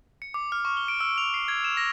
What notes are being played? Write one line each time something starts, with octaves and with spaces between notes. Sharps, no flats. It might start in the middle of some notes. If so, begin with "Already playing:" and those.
C#7
D6
F6
C#6
G7
D7
E6
F7
C7
G#6
E7
A#6